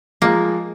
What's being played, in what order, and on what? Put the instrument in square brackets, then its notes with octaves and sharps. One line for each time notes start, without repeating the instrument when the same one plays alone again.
[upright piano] F3 G#3 [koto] A#3